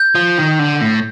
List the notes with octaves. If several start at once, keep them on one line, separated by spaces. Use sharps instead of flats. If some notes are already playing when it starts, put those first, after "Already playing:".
Already playing: G6
F3
D#3
D3
A2